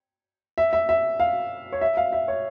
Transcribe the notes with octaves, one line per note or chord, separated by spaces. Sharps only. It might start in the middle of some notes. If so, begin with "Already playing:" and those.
E5
E5
E5
F5
C#5
E5
F5
E5
C#5